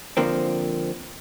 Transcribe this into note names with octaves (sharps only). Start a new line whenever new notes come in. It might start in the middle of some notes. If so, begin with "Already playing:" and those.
D3 F3 A#3 C4